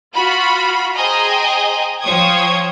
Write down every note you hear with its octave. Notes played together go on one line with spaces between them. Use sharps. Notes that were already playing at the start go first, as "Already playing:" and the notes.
F4 F#4 B5
G#4 C5 D#5 G5 G#5 A#5
F3 C5 C#5 G5 D#6 G#6